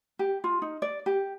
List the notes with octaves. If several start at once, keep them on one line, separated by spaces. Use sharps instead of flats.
G4
F4
D#4
D5
G4